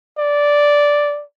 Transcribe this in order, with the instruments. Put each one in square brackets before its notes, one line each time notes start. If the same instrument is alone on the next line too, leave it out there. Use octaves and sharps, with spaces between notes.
[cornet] D5